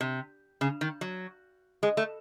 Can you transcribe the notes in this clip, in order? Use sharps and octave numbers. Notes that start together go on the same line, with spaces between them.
C3
C#3
D#3
F#3
G#3
A3